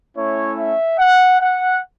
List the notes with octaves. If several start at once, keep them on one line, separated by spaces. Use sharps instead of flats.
A3 C#4 E4 C#5
E5
F#5
F#5